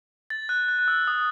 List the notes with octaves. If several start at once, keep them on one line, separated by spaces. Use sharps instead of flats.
A6
F#6
F#6
F#6
E6
D#6